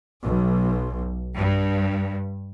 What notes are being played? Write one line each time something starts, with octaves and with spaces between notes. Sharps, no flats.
B1
G2